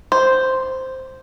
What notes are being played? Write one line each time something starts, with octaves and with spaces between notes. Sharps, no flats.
C5